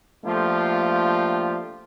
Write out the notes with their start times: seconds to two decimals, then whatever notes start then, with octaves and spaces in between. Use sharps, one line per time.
0.25 F3 A3 A#3 D4 F4 G4